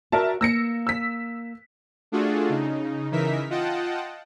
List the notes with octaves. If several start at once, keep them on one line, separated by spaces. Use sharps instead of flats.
F#4 A#4 D5 E5 A5
A#3 F5 E6 A#6 C#7
E6 B6
A3 D4 F4 F#4 G#4 A4
C#3 D#4
C#3 E3 D#4 A#4 E5 B6
F4 D#5 F#5 G5 A5